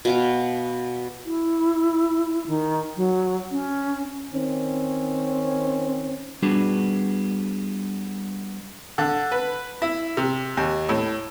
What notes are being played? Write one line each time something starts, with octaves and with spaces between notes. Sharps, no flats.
B2 F5 G5
E4
D#3
F#3
C#4
D#3 C4 C#4
G3 B3 D4 F#4 G#4
D3
B4
E4
C3
D#2
A2